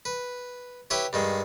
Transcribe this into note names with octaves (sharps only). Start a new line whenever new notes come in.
B4
E4 G4 B4 C#5
G2 D#3 G#3